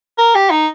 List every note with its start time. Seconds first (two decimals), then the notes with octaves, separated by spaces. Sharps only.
0.18 A#4
0.35 G4
0.51 D#4